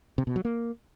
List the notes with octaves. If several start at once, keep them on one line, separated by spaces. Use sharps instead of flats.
C3
B2
F#3
A#3